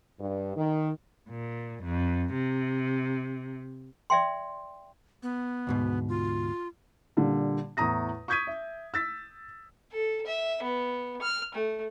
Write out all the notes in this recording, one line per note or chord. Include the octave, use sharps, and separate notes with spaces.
G2
D#3
A#2
F2
C3
D5 E5 G5 C6
B3
D2 G#2 B2
F4
A#2 D3 G3
E2 A2 A#5 D#6 A#6
C#6 D#6 G6 G#6 B6 D#7
E5
E6 A6 B6
A4
E5
B3
F6
A3